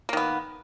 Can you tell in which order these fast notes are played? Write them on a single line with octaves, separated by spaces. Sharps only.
A#3 D#3 B3